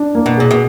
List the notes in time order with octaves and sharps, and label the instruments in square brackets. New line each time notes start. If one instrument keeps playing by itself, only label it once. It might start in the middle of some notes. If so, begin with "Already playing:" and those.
Already playing: [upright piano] D4
A#3
[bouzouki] B2
[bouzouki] A#2 [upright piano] G#4
[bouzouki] B2